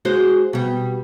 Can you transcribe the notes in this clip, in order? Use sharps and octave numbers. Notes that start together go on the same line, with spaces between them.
G#3 F#4 C5
B2 G3